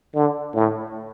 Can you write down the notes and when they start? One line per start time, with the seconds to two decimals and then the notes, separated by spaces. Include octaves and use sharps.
0.15 D3
0.54 A2